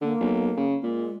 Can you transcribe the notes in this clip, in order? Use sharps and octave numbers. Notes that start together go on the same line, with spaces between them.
D3 A#3
B1
C#3
A#2 G#3